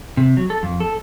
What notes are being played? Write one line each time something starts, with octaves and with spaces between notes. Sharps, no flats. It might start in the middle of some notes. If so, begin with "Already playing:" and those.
C3
F#3
A4
F2
A4